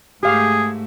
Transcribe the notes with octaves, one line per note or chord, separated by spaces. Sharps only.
G#2 A3 G4 G#4 F5